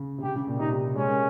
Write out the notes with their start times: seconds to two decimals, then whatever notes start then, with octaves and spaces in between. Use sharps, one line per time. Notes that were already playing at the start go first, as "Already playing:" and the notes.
Already playing: C#3
0.18 C3
0.23 C#3 G4
0.36 C#3
0.47 A#2
0.59 C3 D#4
0.71 G3
0.84 G3
0.95 G#3 C#4
1.07 A#3